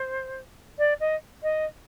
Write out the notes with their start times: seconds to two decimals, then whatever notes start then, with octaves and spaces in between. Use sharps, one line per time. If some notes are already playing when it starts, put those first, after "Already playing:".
Already playing: C5
0.78 D5
1.00 D#5
1.42 D#5